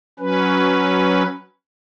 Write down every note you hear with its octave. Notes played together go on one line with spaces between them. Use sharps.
F#3 C#4 B4